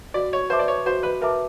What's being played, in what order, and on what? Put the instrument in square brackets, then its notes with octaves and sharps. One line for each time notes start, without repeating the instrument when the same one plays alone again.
[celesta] F#4 [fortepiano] D5
[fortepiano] C#5
[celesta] B4 E5 A5 D6 [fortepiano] C5
[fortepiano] D5
C#5
[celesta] F#4 [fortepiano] C5
[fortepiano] B4
[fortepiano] A#4 [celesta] B4 E5 A5 D6